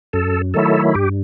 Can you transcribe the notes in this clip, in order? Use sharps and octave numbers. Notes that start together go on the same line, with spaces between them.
F#2 A4
D#3 F#3 A3 E4 A4
G2 G4